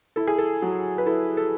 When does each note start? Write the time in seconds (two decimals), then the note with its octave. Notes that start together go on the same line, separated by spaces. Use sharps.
0.16 E4 A4
0.27 G#4
0.38 A4
0.62 F#3
0.98 B4
1.06 E4 A4
1.37 A4